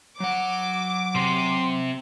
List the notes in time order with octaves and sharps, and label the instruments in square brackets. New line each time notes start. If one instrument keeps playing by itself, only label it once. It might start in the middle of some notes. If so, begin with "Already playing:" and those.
[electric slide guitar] F#3 F#5 [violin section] D6
[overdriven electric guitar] C3 [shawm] C6